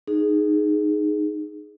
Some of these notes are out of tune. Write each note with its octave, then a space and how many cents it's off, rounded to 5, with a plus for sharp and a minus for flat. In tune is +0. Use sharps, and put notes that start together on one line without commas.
D#4 -10 G#4 +5